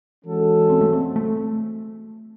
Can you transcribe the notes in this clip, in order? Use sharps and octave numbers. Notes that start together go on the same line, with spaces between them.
E3 G#3 C#4 F#4 A4
C4
A3
C4
A3